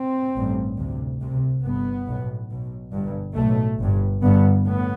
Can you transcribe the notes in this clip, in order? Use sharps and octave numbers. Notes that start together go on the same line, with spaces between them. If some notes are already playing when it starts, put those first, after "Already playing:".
Already playing: C4
A1 G2
D2 C3
C2 C3
G1 G2 B3
B1 A2
B1 B2
G1 G2
B1 A2 A3
G1 G2
G1 G2 B3
A2 B3